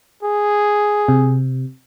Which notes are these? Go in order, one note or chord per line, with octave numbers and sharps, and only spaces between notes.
G#4
C3